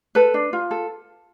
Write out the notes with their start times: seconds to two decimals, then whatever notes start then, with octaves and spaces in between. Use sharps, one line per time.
0.15 A4 B4
0.34 D4
0.53 F4
0.71 A4